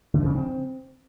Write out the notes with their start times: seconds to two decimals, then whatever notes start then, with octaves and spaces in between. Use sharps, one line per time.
0.14 D3
0.19 F3
0.25 C#3
0.30 D4
0.35 C4